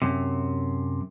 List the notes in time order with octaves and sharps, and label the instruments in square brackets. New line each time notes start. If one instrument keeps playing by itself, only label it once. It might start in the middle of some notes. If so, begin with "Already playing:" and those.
[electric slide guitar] F#2 C3